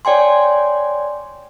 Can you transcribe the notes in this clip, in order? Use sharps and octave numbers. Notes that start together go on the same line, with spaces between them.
C#5 D5 G5 G#5 C6